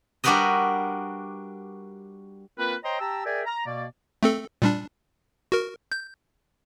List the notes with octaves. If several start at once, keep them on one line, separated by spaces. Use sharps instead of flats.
G3 D4 F#4 A#4 B4 D#5
A#3 C4 F4 A#4 B4
C5 C#5 D#5 G5 A#5 C6
G4 G5 A5 A#5 E6
G#4 A#4 D5 E5 G5 G#5
A#5
B2 A#3 D5
A3 C4 A4
A#2 G3 D4
F#4 A#4
G6